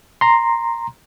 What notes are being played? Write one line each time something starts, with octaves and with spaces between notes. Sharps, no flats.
A#5 C6